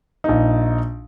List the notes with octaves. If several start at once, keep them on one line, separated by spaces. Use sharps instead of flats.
A#1 D#4